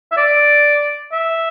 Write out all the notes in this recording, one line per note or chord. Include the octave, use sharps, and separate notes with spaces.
E5
D5
E5